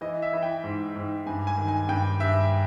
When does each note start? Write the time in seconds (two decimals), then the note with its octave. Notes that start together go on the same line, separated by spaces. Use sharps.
0.01 E3 D#5
0.22 E5
0.33 E3
0.43 G5
0.64 G#2
0.96 G#2
1.27 G2 G#5
1.47 G#5
1.58 D#3
1.68 G#5
1.89 G2 G5
2.20 G2 E5